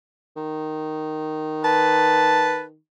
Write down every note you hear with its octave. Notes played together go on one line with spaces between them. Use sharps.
D#3
B4 A5